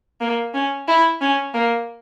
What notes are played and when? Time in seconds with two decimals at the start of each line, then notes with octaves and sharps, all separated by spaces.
0.21 A#3
0.54 C#4
0.88 E4
1.21 C#4
1.54 A#3